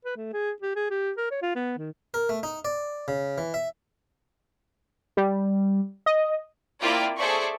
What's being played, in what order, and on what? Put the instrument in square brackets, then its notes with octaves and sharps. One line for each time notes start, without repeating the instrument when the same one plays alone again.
[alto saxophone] B4
A3
G#4
G4
G#4
G4
A#4
C#5
F4
B3
D#3
[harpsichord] A#4
A3
D#4
D5
C#3
E3
E5
[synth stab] G3
D#5
[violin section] A#3 C4 E4 F4 D5 G5
G#4 A4 C5 D5 E5 C#6